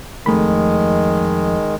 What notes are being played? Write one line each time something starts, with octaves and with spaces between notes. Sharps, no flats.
F2 D#3 G#3 A3 B5